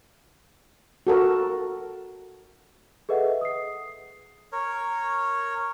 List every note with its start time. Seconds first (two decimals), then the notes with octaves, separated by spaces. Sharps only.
1.07 F#4 A4 A#4
3.09 G#4 A4 B4 D#5 E5 F#5
3.41 D#6 C7
4.52 A#4 C#5